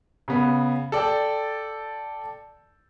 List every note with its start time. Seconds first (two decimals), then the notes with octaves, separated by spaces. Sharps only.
0.28 C#3 B3
0.92 A4 D5 G5